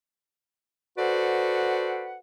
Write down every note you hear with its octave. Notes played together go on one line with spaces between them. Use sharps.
F#4 A4 B4 C5 D5 F#5